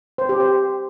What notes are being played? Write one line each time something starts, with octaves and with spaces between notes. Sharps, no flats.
C5
G4
C5